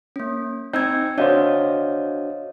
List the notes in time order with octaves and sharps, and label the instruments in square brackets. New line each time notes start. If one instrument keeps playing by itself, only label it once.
[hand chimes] A#3 C#4
[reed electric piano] C4 D#4 G6 [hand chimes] G5 E6 G#6
[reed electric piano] D4 F#4 C5 [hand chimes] C#5 D#5 F5